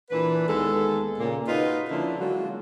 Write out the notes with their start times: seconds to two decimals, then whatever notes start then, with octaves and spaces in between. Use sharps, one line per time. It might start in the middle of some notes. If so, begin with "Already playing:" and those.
0.10 A#2 E3 D4 B4
0.48 D#2 G#3 B3 A4
1.18 A#2 C#3 A#3
1.47 D#4 F4 F#4 B4 D#5
1.89 D3 F3 A#3 C#4 D4 E4
2.19 F#3 G#3 A#3 F4 F#4